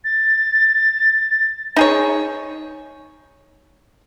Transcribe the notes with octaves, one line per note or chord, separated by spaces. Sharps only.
A6
D#4 G#4 C#5